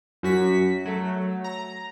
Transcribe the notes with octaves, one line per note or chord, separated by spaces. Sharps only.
F#2 F#4 B6
F#3 A3
A#5